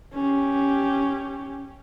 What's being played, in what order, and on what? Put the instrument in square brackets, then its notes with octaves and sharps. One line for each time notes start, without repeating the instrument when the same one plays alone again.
[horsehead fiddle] C#4 G4